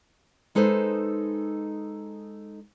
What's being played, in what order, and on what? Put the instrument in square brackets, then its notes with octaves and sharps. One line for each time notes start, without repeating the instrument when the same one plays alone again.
[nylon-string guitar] G#3 D#4 A4 B4 C5